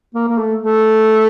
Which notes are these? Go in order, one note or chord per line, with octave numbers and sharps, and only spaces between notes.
A#3
A#3
A3
A3